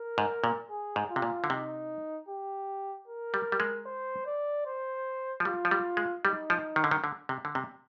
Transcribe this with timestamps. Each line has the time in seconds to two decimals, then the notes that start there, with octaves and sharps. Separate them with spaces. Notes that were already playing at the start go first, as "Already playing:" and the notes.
Already playing: A#4
0.18 G#2
0.44 A#2
0.70 G#4
0.96 G#2
1.09 F4
1.16 C3
1.22 A#2
1.44 D3
1.50 C3 D#4
2.28 G4
3.08 A#4
3.34 G3
3.52 G3
3.60 G#3
3.86 C5
4.26 D5
4.66 C5
5.40 F3
5.45 G3 F4
5.65 F3
5.71 G3
5.97 G#3
6.24 G3 D#4
6.50 F3
6.76 D#3
6.84 D3
6.91 D#3
7.04 D3
7.29 C3
7.45 D3
7.55 C3